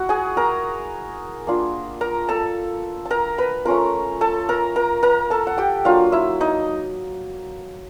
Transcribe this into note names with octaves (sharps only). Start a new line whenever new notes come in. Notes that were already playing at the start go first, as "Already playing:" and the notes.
Already playing: E4 F#4 F#5
G#4 G#5
A#4 A#5
A#3 D4 F4
A#4 A#5
A4 A5
A5
A#4 A#5
B4 B5
A3 C#4 F4 A#4 A#5
A4 A5
A#4 A#5
A#4 A#5
A#4 A#5
A4 A5
F#5
G4 G5
F#3 A#3 D4 F4 F5
E4 E5
D#4 D#5